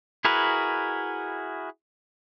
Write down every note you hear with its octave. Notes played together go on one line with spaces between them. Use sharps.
E4 F#4 G#4 A#4 B4